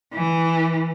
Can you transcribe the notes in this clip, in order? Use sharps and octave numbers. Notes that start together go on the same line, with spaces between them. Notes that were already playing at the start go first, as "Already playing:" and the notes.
E3